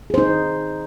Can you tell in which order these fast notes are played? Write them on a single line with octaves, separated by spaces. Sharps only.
G#4 C5 D#4